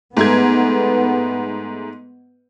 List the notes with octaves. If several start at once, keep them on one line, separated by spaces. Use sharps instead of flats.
G#2 A3 B3 G#6